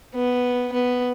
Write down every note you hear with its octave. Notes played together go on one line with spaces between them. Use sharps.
B3
B3